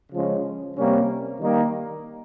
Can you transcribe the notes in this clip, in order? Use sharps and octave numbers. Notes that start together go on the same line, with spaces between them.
C#3 F3 G#3 C#4
C3 G3 A#3 C#4
D#3 G3 A#3 D#4